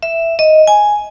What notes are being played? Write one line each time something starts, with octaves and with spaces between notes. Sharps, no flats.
E5
D#5
G#5